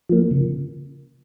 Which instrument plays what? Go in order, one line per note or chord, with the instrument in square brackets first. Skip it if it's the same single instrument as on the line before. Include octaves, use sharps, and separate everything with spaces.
[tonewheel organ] F3 A#3
C#3